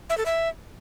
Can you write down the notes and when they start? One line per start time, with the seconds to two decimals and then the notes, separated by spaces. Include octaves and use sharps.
0.09 E5
0.18 A4
0.26 E5